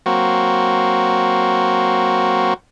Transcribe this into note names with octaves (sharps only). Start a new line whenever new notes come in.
F#3 A#3 C4 F#4